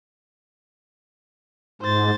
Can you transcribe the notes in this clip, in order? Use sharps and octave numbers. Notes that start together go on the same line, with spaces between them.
G#2 C5 A6